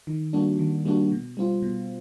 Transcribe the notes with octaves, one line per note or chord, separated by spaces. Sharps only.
D#3
G3 A#3 D4 F#4
D#3
G3 A#3 D4 F#4
B2
G3 C4 F4
B2